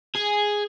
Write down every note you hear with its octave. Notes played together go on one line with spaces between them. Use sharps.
G#4